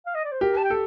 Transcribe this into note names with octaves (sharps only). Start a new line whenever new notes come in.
F5
D#5
D5
C5
G4 A#4
A5
G5
A4